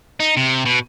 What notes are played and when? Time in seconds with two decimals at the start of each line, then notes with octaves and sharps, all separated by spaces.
0.20 D#4
0.37 C3
0.65 B2